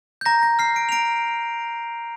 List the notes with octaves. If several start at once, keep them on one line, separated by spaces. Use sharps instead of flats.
G6
A#5 A#6
A#6
F6 C7
D7
F7
A#5 D7